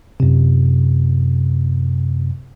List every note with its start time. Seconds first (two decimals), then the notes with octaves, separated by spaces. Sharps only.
0.20 F#2 C3